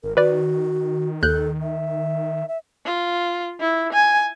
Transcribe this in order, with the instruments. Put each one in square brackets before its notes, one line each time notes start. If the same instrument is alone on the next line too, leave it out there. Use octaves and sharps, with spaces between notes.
[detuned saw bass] G#1 [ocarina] A#4
[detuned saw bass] D#3 [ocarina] F#4 [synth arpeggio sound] B4 D5
[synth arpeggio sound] D#2 F#6 G6 [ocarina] A4
[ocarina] E5
E5
[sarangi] F4
E4
G#5